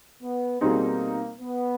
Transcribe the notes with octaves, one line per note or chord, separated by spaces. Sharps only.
B3
B2 G3 A#3 C4 D#4 G#4
B3